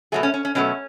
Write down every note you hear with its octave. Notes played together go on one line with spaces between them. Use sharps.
B2 F#3 A3 G#4
C#4
C#4
C#4
B2 F#3 A3 C#4